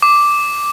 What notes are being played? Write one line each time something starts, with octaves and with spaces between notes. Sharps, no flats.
D6